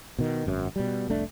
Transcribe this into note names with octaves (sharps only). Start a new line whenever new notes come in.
B2 D#3
G#1 F#2
B2 G3
F1 C2 A3 D4